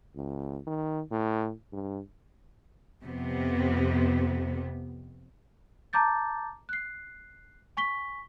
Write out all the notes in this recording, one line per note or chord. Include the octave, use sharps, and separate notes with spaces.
C#2
D#3
A2
G2
F2 C3 B3
A5 A#5 D6 G6 A6
F#6 C7
G#5 C#6 B6 G7